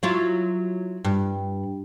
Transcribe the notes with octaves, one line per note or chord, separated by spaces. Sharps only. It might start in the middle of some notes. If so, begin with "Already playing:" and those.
F#3 E4 F4
G2